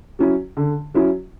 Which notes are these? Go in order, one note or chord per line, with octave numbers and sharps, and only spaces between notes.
F#3 C#4 E4
D3
F#3 C#4 E4